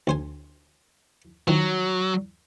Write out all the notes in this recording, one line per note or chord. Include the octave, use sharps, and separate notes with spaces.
D2 C5 G#5
D#3 F3 F#3